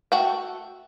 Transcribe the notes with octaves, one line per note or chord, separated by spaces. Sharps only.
A3 F#4 F#5 G5